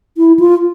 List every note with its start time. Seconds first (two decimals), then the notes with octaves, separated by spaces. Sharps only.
0.18 E4
0.39 F4